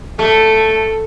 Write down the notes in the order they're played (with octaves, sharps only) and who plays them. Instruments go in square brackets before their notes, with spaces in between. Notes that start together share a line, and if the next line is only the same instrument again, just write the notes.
[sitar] A3 [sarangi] A4